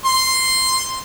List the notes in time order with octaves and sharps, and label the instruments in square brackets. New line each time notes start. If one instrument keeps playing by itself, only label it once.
[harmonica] C6